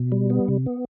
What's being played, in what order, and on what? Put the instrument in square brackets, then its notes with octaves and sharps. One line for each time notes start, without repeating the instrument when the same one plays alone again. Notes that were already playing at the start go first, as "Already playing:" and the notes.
Already playing: [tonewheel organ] B2
G3
B3
C3
B3